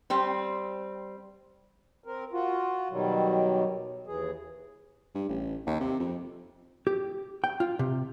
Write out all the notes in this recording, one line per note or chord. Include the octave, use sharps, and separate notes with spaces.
G3 C4
C4 A#4
F4 F#4
B2 D#3 F#3 G3
D#2 E3 G#4
G2
A1
D#2
C3
F2
G4
G5
F4
C3